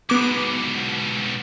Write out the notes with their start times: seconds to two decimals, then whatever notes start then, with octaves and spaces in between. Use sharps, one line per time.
0.10 G#2 B2 B3 D6